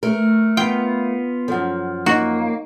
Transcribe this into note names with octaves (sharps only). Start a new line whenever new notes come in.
A3 A#4
B3 F4 G5
F#2 F3 A4 F#5
A#3 D#4 F#4 D#5